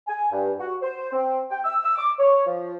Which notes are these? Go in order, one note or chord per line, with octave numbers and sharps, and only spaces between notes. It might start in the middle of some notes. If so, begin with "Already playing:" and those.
G#5
G2
F#4
C5
C4
G5
E6
E6
D6
C#5
F3